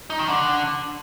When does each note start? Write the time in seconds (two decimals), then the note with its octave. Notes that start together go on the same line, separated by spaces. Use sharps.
0.10 D#4
0.19 D#3
0.28 D3